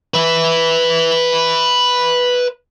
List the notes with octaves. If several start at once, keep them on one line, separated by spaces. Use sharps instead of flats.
B4 E5